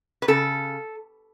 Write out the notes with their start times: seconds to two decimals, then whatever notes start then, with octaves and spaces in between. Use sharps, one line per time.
0.22 B4
0.28 C#3 A4